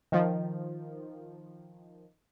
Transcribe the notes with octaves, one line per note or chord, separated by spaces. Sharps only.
D#3 F3